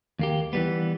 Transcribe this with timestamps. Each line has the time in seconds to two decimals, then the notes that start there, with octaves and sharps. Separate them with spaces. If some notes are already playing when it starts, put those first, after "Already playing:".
0.19 D#2 A#3 G4
0.53 E3 G3 B3